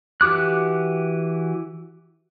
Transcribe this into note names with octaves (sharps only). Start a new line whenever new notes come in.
E3 F#4 G4 D6 F#6